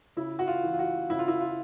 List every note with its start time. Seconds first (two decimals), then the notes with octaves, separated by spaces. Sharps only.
0.17 C#3 E4
0.39 F#4
0.48 F4
0.64 E3
0.74 F4
0.79 F#4
1.10 C#3 E4
1.19 F4
1.28 E4
1.41 F4